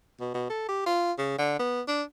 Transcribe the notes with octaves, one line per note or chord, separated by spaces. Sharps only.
B2
B2
A4
G4
F4
C#3
D3
B3
D4